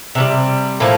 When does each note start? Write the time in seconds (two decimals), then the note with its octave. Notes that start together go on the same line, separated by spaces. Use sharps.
0.15 C3 E3 G3
0.80 A2 F3 A#3